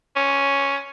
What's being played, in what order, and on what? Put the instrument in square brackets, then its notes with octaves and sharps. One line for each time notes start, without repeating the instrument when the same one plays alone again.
[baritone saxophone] C#4